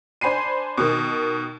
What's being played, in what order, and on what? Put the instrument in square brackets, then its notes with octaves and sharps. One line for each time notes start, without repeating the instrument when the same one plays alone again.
[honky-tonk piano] D4 C5 G#5 B5 C7 D#7
B2 D#3